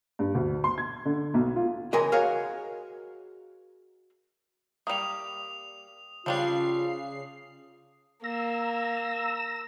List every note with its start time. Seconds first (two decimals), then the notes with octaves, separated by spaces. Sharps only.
0.19 G2
0.35 D2
0.64 C6
0.78 G#6
1.05 D3
1.34 B1
1.56 F4
1.93 C#3 E3 G#3 A#4 D#5
2.12 F#4 G#4 A#4 C#5 D#5 F5
4.87 G3 A#3 D#6 F7
6.26 C#3 F3 G3 D4 F4 C7
8.24 A#3 A#5 E6